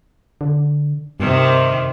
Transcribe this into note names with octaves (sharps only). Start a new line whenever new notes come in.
D3
G2 C3 D#3